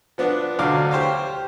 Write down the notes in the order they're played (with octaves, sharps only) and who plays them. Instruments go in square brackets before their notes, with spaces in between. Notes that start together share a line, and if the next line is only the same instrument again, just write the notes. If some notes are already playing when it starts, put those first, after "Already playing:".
[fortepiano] F3 B3 D4
D2 B2 F#3 F5 D6
G4 C5 C#5 F5